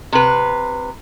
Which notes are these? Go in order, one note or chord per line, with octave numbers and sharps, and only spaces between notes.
C3 B4